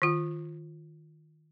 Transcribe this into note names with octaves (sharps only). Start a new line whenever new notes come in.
D#3 F4